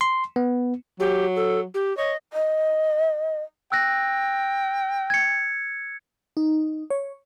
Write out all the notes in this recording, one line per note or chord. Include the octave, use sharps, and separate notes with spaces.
C6
B3
F#3 G4
A4
G4
C#5 D#5
D#5
G5 E6 F#6 A#6
G#6 C#7
D#4
C#5